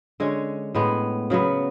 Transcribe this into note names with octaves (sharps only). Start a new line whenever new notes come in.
D3 G#3 C#4
A2 G#3 B3
C#3 F#3 B3